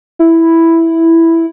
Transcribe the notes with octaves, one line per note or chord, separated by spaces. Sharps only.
E4